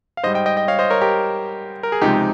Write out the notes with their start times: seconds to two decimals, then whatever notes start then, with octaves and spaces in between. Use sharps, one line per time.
0.17 F5
0.23 G#2 C5 D#5
0.27 G3
0.34 D#5 G5
0.46 D#5 G5
0.57 D#5 G5
0.68 C#5 F5
0.79 C5 D#5
0.90 A#4 C#5
1.01 G4 A#4
1.83 A#4
1.92 G#4
2.02 C#2 C3 F3 G#3 D#4 G4